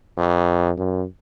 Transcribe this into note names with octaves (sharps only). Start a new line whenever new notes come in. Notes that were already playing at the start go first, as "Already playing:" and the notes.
F2
F#2